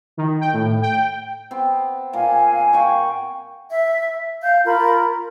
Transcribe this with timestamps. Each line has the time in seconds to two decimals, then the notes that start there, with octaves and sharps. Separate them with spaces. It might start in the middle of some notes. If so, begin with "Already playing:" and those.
0.17 D#3
0.41 G5
0.53 A2
0.82 G5
1.51 B3 C4
2.13 A#2 A#3 F5 G#5
2.73 F#5 G5 C#6
3.71 E5
4.42 F5 G6
4.66 F4 A#4 B5